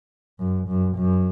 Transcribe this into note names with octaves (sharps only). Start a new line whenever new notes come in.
F#2
F#2
F#2